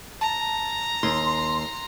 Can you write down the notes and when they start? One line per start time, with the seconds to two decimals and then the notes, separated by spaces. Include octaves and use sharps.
0.21 A5 A#5
1.03 D#2 C6